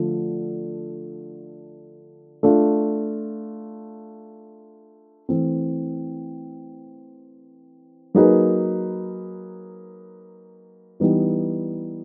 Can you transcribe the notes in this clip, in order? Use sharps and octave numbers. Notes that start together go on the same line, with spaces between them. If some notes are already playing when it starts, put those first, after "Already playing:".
Already playing: D3 F3 A3
A3 D4 F4
E3 A3 C4
F#3 A#3 D#4 G#4 B4
E3 G3 B3 D#4 G4